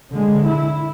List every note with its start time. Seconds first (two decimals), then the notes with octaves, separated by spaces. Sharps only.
0.10 D3 G#3
0.46 E4